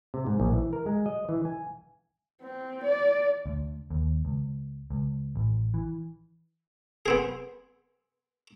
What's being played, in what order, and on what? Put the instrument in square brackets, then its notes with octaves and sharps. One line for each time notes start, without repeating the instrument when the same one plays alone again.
[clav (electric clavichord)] C3
G#2
A#1
E3
A#4
G#3
D#5
E3
G#5
[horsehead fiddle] C4
D5
[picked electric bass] D2
D#2
C#2
C#2
A1
E3
[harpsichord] B3 C4 G#4